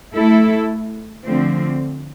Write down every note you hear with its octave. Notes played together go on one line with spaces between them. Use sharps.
A3 E4 A4
D3 F3 A3 C4